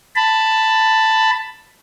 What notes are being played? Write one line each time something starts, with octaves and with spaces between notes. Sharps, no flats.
A5 B5